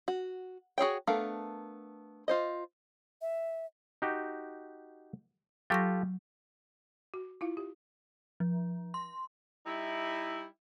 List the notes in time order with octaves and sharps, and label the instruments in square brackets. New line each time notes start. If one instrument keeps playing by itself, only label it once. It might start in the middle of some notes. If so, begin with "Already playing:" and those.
[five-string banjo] F#4
F#4 G#4 C#5 G5
A3 B3 D4 A#4 F5
F4 C5 D#5
[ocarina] E5
[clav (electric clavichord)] D#4 F#4 G4
[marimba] F#3 C#6 A#6 [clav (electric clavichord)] F4 G4 A4
[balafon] F#4
E4 F4 F5
G4
[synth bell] F3
C6
[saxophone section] G3 D#4 E4